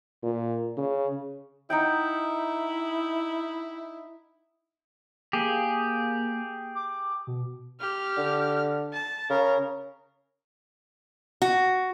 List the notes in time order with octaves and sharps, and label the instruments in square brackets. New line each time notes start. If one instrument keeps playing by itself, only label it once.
[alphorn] A#2
C#3
[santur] D#4 F#5 G5 [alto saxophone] E4
[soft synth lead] A#3 [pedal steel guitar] G4 G#4
[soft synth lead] D6
B2
[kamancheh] G4 F6
[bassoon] D3
[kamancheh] A5
[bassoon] C#3 [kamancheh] A#4
[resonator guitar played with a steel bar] F#4